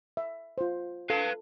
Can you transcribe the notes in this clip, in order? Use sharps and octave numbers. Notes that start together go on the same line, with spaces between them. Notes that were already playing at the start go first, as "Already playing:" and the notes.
E5
F4 C5
A4 B4 F5